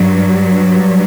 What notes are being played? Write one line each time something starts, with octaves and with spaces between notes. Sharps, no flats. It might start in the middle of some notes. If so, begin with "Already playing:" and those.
Already playing: G2 F#3